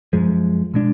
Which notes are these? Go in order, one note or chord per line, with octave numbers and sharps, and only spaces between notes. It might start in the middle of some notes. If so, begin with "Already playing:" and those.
F#2 F3 G#3
B2 G#3 D4